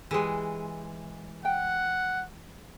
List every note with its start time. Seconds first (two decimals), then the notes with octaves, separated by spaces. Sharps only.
0.11 E3 G#3 G4 G#4 B4
1.45 F#5 G5